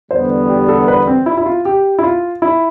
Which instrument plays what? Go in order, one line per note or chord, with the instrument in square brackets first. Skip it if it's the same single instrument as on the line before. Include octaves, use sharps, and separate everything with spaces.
[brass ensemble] E2 D3 G3 B3 [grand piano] C5
[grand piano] G4
A4
B4
C4
E4
E4
F4
G4
E4
F4
E4